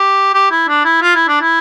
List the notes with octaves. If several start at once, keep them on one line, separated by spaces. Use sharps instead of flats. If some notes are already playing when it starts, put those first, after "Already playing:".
Already playing: G4
G4
E4
D4
E4
F4
E4
D4
E4